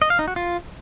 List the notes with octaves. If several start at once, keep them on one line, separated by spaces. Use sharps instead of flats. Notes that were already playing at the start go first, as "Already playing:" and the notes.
D#5
F5
D#4
F#4
F4